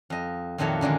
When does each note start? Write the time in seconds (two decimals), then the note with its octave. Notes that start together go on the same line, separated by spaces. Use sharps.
0.10 F2 D#5
0.58 F2 A#2 D#3 F#3 A3 C#5
0.81 F#2 D3 D#3 G#3